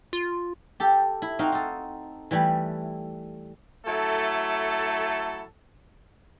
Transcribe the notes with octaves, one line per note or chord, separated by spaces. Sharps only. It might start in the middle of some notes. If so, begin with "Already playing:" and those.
F4
G4 A4
E4
C4 D#4 F#4 F5
D#4 A4
E3 G3 A3 E4
F#3 A3 E4 A4